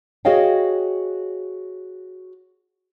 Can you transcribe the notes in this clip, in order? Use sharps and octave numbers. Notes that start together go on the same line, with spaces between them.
F#4 G#4 C#5 D#5 F5 G5